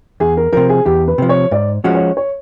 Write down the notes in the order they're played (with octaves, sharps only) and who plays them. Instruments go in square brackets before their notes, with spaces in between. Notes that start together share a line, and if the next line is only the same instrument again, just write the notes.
[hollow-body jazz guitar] E2 [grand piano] G#4
[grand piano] A#4
[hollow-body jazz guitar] C3 F3 [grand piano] A#4
[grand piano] G#4
[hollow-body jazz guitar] E2 [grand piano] G4
[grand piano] B4
[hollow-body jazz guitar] C3 F3
[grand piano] C#5
[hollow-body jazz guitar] G#2 [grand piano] D5
[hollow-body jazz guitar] F3 G#3 C#4 F#4
[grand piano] C#5
C#5